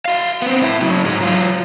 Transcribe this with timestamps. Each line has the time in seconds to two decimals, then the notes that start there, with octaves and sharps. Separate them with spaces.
0.05 F#4 F5
0.42 B3 C4
0.63 A2 E4
0.81 C#3 F#3
1.05 G#2 G#3
1.21 F#3 F4